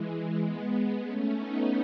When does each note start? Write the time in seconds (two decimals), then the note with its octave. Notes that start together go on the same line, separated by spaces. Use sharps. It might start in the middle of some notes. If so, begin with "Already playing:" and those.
Already playing: E3 G#3
0.45 G#3 B3
1.06 A3 C#4
1.36 B3 D#4